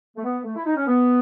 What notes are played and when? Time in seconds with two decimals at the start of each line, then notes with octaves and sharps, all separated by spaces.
0.16 A3
0.24 B3
0.44 A3
0.56 E4
0.66 D#4
0.76 C#4
0.87 B3